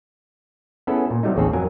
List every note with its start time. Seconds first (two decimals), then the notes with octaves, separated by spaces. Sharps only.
0.87 B3 C#4 E4 G#4 A4
1.10 A#2
1.23 C3 F#3 G3 A3 D#4
1.36 A1 D#2 C#3 C4 G#4 A4
1.53 F2 F#3 A#4 G#5